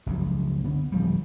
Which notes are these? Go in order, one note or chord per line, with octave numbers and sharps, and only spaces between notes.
F#1 C#2 F3
D3 B3
D1 F3 G3